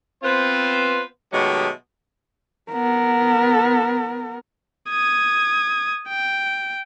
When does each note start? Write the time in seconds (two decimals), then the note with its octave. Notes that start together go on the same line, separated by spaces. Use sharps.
0.23 B3 C4 F4 B4 C5
1.33 B2 D#3 F#3 G#3 A3 G4
2.72 B3 A#4
4.90 D#6 G#6
6.08 G5